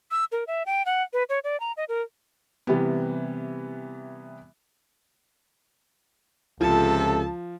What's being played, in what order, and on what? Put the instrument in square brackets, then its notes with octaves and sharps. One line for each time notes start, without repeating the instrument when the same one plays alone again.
[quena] E6
A#4
E5
G5
F#5
B4
C#5
D5
A#5
D#5
A#4
[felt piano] C3 E3 G3 B3
[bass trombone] C#2 [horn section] C3 A4 [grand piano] F3 [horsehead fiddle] A5